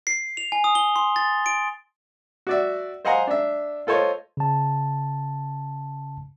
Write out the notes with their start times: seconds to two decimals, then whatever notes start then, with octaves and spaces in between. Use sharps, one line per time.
0.07 C7
0.37 F7
0.52 G#5
0.64 D#6
0.75 G7
0.96 C6
1.16 A6
1.46 D7
2.47 F#4 D5 E5
3.05 C5 D#5 F5 F#5 G#5 A#5
3.27 D4 E5
3.87 F4 A4 C5 C#5 D#5
4.37 C#3 A5